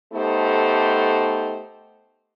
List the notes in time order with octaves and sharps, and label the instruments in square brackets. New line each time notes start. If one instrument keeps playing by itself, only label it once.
[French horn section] A3 B3 D#4 G4 A4 C5